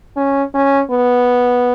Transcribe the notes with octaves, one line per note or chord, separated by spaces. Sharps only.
C#4
C#4
B3